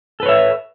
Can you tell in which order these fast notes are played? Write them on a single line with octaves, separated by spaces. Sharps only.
A4 B4 C#5 E5